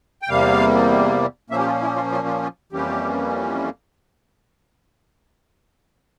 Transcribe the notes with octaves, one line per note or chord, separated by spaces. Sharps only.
G5
E2 C3 G3 A#3 F5
A#2 F3 A#3 C#4 E5
G4
F4
E4
F4
F4
F4
F4
F2 E3 G3 A#3 C#4 G4